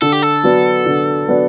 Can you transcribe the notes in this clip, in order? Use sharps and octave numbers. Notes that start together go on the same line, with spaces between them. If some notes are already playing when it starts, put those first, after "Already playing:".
D3 A4
G4
A4
F#3 B3 D4
D3
F#3 B3 D4